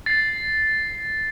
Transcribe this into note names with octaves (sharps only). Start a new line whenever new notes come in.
A6 C7